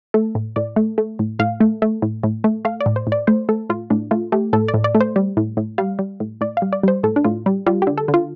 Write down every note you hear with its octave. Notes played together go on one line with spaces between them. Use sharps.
A3 A4
A2
A2 D5
A3
A3
A2
A2 F5
A3
A3
A2
A2
A3
A3 F5
D5
A2
C5
A2
D5
A3 C5
A3 A4
A2 F4
A2 D4
A3 F4
A3 G4
A2 A4
D5
A2
D5
A3
C5
G3
A2
A2
G3 F5
G3
A2
A2 D5
F5
G3
D5
G3 C5
A2 A4
D4
A2 F4
G3
G3 F4
D3 G4
A4
D3
F4